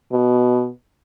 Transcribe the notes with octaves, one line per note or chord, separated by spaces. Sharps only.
B2